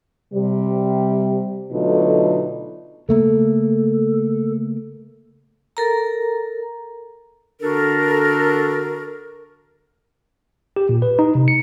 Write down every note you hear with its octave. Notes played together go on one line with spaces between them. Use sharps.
C3 G3
B2 D3 F#3 A3 D#4 F4
C#3 A3 A#3 A4
A4 A#4 A#5
D3 D4 F#4 A4 A#4
G4
A#2
B4
D#4
C3
C#7